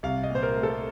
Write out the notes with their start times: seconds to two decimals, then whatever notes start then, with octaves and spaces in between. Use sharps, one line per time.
0.03 C2 F5
0.23 D#5
0.30 A#2 C5
0.43 A#4
0.57 A3
0.63 A4